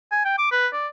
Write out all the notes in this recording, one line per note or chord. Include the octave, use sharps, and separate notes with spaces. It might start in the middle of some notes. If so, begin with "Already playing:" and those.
G#5
G5
D6
B4
D5